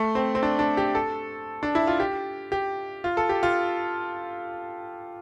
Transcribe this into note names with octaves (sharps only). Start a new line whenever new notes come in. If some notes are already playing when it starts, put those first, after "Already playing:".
Already playing: A3
C4
C4
D4
D4
G4
A4
D4
E4
F4
G4
G4
F4
A4
G4
F4